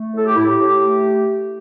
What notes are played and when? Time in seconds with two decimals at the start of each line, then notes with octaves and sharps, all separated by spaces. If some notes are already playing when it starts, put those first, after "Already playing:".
Already playing: A3
0.14 A2 A4
0.25 G4
0.36 A2 E4
0.48 G4
0.58 A2
0.80 A3